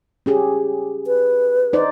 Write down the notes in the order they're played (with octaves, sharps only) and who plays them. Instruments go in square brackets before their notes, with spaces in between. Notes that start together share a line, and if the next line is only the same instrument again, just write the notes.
[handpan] C#4 G4 G#4
[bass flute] B4
[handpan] D#4 C5 D5